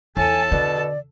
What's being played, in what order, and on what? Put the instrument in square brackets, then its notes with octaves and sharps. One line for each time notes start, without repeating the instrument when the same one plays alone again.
[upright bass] E2 [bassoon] A2 [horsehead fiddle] A4 A5 [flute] G#5
[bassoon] B2 [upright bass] D3 [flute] D5